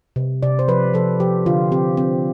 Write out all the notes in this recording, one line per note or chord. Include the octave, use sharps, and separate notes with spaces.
C3
C3 D5
C5
F3 B4
F3 A4
F3 G4
D3 F4
C4 G4
C4